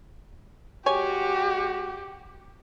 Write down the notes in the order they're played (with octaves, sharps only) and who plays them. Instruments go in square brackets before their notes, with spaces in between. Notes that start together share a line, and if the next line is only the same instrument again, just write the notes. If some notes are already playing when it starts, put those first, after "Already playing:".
[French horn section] G#3 F#4 [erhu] G4 [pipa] C#5 G#5